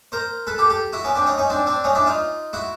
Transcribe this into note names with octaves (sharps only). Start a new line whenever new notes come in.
A#4 C5
A4 B4
G4 A4
G4 A4
E4 F#4
B3 C#4
C4 D4
C#4 D#4
C#4 D#4
C4 D4
C4 D4
C#4 D#4
D4 E4
D#4 F4
E4 F#4